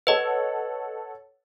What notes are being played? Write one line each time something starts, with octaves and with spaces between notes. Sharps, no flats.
A4 B4 C#5 D#5 F#5